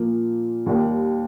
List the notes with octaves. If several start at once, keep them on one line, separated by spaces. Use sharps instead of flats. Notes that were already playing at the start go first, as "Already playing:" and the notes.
Already playing: A#2 F3 A#3
D#2 D#3 G3 A#3